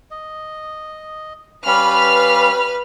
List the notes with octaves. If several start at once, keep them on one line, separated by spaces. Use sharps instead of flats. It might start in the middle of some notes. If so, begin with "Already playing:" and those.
D#5
G3 C#4 B4 F5 B5 F6